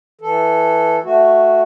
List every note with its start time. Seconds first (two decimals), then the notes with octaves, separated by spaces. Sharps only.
0.21 E3 A4
1.04 A3 F#4